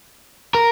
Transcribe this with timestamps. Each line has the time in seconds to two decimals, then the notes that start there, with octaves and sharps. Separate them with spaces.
0.55 A#4